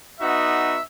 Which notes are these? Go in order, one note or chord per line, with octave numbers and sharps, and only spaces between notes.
B3 D#4 F#4 E5